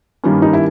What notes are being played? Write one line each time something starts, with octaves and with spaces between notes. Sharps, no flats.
G2 D#3 G3 A#3 C#4
D#4
E4